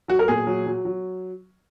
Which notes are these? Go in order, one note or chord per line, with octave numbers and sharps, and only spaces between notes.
F#3 F#4
A#4
A#2 G#4
F#3
F#3
F#3